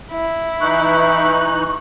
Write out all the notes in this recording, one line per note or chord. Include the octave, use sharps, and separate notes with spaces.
E4
E3 D#4 C#6 F#6